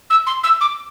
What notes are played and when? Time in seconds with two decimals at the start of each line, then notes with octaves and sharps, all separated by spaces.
0.10 E6
0.26 C6
0.43 E6
0.61 D6